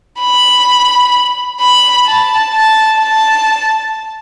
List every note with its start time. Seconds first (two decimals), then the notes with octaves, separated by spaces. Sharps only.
0.19 B5
1.60 B5
2.07 A5
2.53 A5
3.00 A5